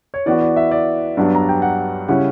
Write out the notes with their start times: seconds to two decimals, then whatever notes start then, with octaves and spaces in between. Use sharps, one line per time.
0.14 C#5
0.26 E3 B3 F#4 D5
0.41 D5
0.56 E5
0.71 D5
1.17 G2 F#3 B3 D4
1.35 A#5
1.49 G5
1.62 F#5
2.08 C#3 G3 C#4 E4 F#5